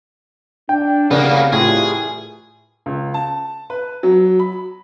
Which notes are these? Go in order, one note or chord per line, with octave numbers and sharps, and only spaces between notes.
D4 G5
C2 C#3 A#3 B3 A#4 D5 F5
C2 A2 E3 F4 G#4
C#2
A5
B4
F#3
B5